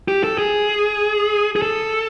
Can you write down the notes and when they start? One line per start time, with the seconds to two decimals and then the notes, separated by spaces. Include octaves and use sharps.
0.08 G4
0.24 A4
0.38 G#4
1.56 G#4
1.62 A4